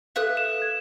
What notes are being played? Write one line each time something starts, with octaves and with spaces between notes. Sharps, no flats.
A4 B4 E5 F5 D#6 F#6
E7
G#6